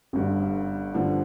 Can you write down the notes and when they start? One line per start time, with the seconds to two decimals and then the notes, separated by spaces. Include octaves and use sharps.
0.13 G1 G2 D3
0.94 G2 D3 F3